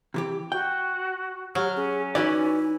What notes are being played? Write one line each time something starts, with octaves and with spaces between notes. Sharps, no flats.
C3 E3 G4
F#4 G5
F#3 G4 F6
C#4 G#4
E3 D#4 F#4 B4 D5